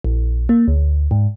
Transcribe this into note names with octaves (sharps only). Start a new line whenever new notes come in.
A#1
A#3
D2
G#2